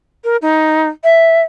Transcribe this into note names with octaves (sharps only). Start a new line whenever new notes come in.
A#4
D#4
E5